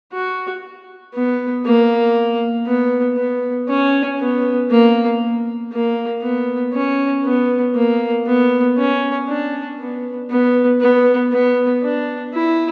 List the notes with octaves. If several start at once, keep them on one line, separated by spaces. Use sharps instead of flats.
F#4
B3
A#3
B3
B3
C#4
B3
A#3
A#3
B3
C#4
B3
A#3
B3
C#4
D4
B3
B3
B3
B3
D4
E4